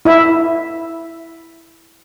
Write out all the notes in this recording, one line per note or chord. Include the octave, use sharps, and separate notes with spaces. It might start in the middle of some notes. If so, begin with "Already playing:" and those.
E4 E5